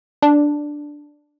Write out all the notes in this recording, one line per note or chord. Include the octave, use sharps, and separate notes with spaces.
D4